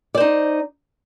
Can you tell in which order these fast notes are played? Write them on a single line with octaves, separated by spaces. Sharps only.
D5 C5 D#4